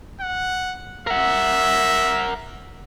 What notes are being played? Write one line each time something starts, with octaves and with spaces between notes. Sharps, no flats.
F#5
A#4 E5 F#5